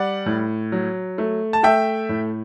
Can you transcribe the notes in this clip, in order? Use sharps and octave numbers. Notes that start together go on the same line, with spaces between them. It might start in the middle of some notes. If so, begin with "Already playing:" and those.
Already playing: G3 D5 F#5
A2
F#3
A3
A5
A3 E5 G5
A2